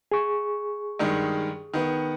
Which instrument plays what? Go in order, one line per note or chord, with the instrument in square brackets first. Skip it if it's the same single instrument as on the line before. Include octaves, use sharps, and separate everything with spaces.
[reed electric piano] G#4 C#6
[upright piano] G2 D#3 G#3
D#3 B3